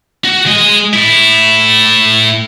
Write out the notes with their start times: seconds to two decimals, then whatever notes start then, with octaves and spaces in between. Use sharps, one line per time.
0.24 F#4
0.46 G#3 D#5
0.93 A2 E4